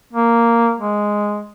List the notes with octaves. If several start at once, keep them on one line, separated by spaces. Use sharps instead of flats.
A#3
G#3